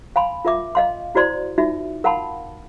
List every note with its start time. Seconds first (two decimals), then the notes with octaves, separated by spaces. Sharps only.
0.16 F5 G#5 B5 C6
0.45 F4 A#4 E5 D6
0.75 D#5 F5 C6
1.15 E4 F#4 C5 D5 C6
1.58 D#4 F4 F#4 E5
2.04 A#4 F5 F#5 A5 B5 C6